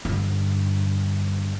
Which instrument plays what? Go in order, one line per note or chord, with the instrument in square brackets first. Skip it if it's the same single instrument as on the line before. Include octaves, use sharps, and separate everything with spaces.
[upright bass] G2 D3